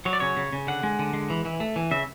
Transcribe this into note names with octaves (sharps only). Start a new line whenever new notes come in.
F#3 C#5
D5
C#3 C#5
C#3
C#3
D3 F#5
G#3
D3
G#3
E3
E3
A3
E3
C#3 E5